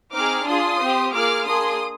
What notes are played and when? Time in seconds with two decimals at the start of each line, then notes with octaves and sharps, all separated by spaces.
0.13 C4 D#4 G#4 D6 F6
0.47 D4 F4 G#4 C6 D#6
0.80 C4 G4
1.13 A#3 F4 G#4 D6 F6
1.47 A#3 D4 G#4 C6 D#6